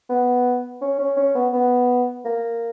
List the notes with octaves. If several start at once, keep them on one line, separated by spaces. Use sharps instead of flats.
B3
C#4
C#4
C#4
B3
B3
A#3